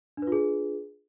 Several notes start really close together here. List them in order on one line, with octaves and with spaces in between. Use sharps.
D4 B4 F4 G#4